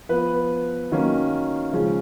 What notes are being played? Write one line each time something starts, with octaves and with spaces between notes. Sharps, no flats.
F3 B3 B4
D#3 F#3 A#3 C#4
C#3 F3 G#3 C#4